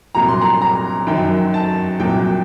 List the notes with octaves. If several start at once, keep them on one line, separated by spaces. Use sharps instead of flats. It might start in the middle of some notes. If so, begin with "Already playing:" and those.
C2 A#2 F#3 A#5
C6
A#5
A#5
F#2 D#3 F#3 G5
A5
C2 A#2 F#3 G5